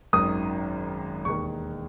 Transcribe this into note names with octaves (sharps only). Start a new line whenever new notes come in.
G#1 F#2 D#3 D#6
E1 D#2 D#3 C#6